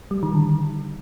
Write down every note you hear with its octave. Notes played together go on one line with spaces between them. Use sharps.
G3
D#3
D3